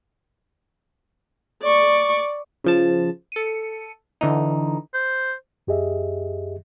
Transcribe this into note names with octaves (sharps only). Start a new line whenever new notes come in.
D5 C#6
C#3 F3 A5
A4 C#7 D#7
D3 E3 D#4
C5
F#2 G4 G#4 D#5 E5